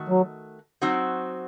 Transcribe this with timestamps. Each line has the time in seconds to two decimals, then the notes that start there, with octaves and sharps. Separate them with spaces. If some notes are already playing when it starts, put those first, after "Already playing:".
Already playing: D#3 A3 F#4
0.09 F#3
0.82 F#3 C4 D#4 F#4